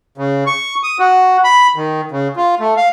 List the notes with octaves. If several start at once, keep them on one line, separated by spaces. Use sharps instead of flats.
C#3
C#6
D#6
F#4
B5
D#3
C#3
F4
A3
F5